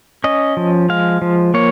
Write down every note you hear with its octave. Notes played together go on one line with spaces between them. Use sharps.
C#4 D#5
F3
G#3 F5
F3
A#3 C#5